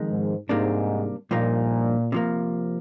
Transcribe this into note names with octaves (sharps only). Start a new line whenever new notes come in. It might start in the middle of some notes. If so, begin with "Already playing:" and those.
Already playing: F2 D#3 G#3
G#2
G#2 C3 G3 A#3 D4
G2 A#2 F3 A#3 D#4
C3 F3 A#3